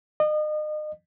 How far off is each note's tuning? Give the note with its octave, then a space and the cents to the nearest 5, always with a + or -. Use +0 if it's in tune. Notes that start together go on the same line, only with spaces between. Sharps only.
D#5 -35